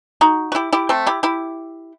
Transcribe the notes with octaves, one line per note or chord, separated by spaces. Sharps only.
D#4 F#4
F#4
E4 G4
E4 G4
A3 C4
E4 G4
E4 G4